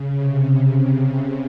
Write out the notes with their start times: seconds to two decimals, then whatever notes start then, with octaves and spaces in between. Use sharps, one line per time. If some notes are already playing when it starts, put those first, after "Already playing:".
Already playing: C#3
0.12 C3
0.51 C#3
0.89 C3